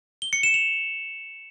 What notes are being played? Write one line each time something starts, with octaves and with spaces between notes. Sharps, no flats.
G7
C#7
E7
F7